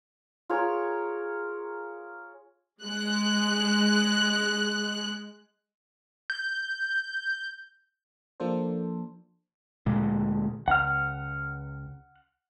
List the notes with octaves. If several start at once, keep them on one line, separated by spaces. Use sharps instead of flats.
F4 G#4 A#4 C#5
G#3 F#6
G6
F3 A#3 D4 A4 C5
D2 A#2 G#3
C#2 F#5 F6